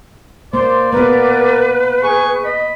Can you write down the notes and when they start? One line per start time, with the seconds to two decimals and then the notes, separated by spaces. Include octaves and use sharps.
0.54 A#3 C5 D5 C6
0.92 A#3 B3 A#4 B4
2.03 G#4 C#6
2.44 D#5 B5